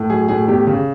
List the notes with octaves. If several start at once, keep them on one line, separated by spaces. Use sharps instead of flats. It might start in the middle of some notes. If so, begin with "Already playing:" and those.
Already playing: A2
F#3 G#4
A2 G#4
E2 G4
C#3